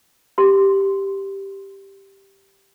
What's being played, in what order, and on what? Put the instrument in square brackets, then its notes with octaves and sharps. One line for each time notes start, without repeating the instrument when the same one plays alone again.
[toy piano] G4 C6